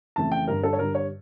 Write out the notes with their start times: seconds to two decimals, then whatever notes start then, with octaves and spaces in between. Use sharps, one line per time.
0.16 F2 C#3 E3 A3 A5
0.32 G5
0.47 G2 D3 G3 A#4
0.63 A4
0.73 C#5
0.79 G2 D3 G3 A#4
0.95 C#5